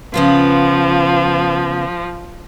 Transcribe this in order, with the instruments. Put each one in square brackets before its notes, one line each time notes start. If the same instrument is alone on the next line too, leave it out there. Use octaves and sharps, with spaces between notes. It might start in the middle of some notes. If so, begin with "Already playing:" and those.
[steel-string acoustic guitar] C#3 B3 F4 [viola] F3